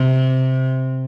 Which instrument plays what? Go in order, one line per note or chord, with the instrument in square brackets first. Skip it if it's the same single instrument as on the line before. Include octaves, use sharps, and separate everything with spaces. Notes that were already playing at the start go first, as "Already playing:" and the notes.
Already playing: [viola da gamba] C3